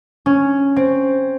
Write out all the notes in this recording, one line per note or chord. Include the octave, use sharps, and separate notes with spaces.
C#4
C4